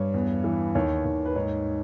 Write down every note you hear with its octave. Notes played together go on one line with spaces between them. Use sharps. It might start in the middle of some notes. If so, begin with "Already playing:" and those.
Already playing: G2 C#5
E2
E3
D#2 C#5
D#2
B4
G#2 C#5